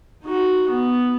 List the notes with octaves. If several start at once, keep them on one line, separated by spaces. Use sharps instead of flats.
D#4 F#4
B3